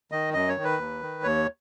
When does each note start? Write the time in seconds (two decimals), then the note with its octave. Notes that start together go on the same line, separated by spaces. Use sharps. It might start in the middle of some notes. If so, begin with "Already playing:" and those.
0.12 D#3 D#5
0.34 F#2 D#5
0.49 C#5
0.57 D#3
0.64 B4
0.79 D#2
1.02 D#3
1.24 D#2 C#5